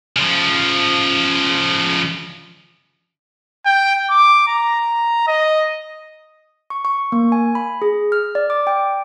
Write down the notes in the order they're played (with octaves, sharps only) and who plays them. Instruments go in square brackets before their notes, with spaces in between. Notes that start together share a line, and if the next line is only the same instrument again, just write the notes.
[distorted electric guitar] C#3 F3
[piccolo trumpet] G5
D6
A#5
D#5
[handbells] C#6
C#6
A#3
G#5
B5
G#4
F6
D5
D6
G5